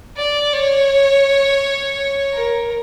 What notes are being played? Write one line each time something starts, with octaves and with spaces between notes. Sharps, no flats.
D5
C#5
A#4